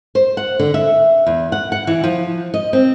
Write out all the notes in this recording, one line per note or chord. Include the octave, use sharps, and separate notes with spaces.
C5
F#5
D3
E5
E2
F#5
F#5
E3
F3
D#5
C4